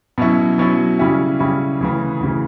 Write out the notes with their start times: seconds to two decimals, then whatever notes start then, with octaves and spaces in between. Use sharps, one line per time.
0.18 B2 F#3 C#4 E4
0.58 B2 F#3 C#4 E4
0.99 C#3 G3 C#4 E4
1.40 C#3 G3 C#4 E4
1.81 D2 C#3 E3
2.21 D2 C#3 E3